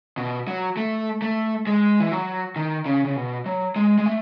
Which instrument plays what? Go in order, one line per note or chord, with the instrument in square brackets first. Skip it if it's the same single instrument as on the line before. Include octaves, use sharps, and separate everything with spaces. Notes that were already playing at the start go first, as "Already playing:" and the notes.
[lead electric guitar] B2
F#3
A3
A3
G#3
E3
F#3
D#3
C#3
C#3
B2
F#3
G#3
G#3
A3